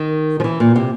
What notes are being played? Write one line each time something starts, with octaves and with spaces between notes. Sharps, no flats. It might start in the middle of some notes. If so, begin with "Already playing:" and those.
Already playing: D#3
F3
E3
A#2
C3